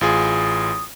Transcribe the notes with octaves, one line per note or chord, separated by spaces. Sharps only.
A1 F4 G#4 D#6